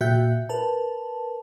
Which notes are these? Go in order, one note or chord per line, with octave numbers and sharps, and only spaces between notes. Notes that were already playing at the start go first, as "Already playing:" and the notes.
A#2 F#4 E5 G5 F#6 G6
A#4 B4 A5